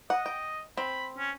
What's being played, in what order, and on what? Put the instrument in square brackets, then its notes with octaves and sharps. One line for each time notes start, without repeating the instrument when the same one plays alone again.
[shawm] D#5 [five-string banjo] F#5
[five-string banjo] G5
[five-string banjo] C4 [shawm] B5
[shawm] C#4